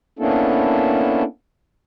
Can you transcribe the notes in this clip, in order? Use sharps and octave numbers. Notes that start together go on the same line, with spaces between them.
A#3 B3 C#4 D4 E4 A4